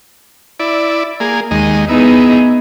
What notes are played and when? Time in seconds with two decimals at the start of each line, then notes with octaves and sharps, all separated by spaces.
0.60 E4 D5
1.20 A#3 G#4
1.51 D#2 G#3 D#5
1.89 B3 D#4 E4 G#4